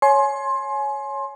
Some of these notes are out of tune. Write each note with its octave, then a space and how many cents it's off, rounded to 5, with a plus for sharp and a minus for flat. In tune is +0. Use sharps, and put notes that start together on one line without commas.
C#5 +0 G#5 +25 C6 +20